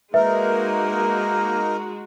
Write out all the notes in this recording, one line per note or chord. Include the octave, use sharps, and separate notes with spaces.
G#3 A#3 D#4 F#4 A#4 B4 E5